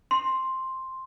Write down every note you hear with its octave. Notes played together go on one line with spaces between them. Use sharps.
C6